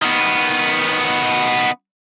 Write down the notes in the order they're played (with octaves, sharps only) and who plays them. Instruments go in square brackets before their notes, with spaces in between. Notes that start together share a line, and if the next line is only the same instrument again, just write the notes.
[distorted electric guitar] D#3 B3